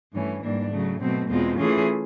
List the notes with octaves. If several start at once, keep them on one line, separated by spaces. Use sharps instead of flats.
G2 E3 A3 C#4
G#2 E3 G3 A#3 D4
C#3 F#3 A3
B2 F#3 A3 C4
E2 B2 G#3 C4 F4
E3 A3 C#4 F4 G#4